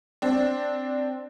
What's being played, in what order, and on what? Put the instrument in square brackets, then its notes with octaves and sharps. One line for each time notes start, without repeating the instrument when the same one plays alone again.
[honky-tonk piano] C4 D4